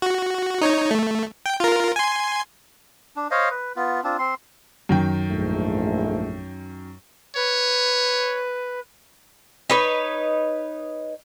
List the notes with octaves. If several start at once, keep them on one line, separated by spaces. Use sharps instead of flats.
F#4
D#4 C#5
A3
G5
F4 A#4
G#5 C6
D4
C5 C#5 D#5 F5
B4
B3 F4
C4 D4 F4
C4 C6
F#2 D#3 G5
A#1 G#2 A3
B4 C#5
D#4 B4 C#5